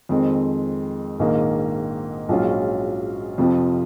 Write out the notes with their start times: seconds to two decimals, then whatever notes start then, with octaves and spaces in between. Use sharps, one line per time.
0.09 F2 D#3 G#3 C4
1.19 A#1 G#2 D#3 A#3
2.29 A#1 G#2 F#3 C#4 F4
3.38 F2 C3 F3